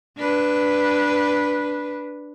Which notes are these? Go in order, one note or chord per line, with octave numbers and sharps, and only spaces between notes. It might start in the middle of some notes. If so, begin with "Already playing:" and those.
D4 B4